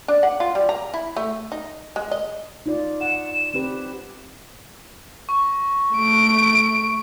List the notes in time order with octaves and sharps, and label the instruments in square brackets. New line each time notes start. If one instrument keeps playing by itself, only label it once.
[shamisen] D4
F#5
F4
G3
A#5
E4
A3
D#4
G#3
D#5
[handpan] D#4 F4 D5
[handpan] F#5 [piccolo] E7
[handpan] C4 G4 B4
[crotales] C#6
[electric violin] A3 D7